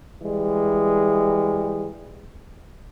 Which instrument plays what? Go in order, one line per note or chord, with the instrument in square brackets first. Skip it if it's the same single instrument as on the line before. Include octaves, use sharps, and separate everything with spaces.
[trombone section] E3 G3 G#3